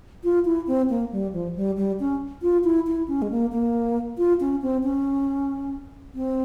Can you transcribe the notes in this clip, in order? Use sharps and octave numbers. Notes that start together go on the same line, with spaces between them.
F4
E4
C4
A#3
G3
F3
G3
G3
C#4
F4
E4
E4
C#4
G#3
A#3
A#3
F4
C#4
C4
C#4
C4